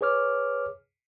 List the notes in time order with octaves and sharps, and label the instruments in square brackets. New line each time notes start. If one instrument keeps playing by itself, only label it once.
[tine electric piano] G#4 B4 C#5 D6 F6